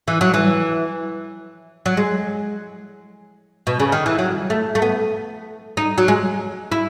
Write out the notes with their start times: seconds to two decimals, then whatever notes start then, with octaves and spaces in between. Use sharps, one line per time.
0.08 E3
0.21 F#3
0.34 E3
1.86 F#3
1.97 G#3
3.67 B2
3.80 C#3
3.92 D#3
4.06 E3
4.18 F#3
4.50 A3
4.75 A3
4.82 B3
5.77 D#4
5.98 F#3
6.08 G#3
6.72 E4